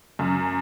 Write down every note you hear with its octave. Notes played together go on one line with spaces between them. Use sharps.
F#2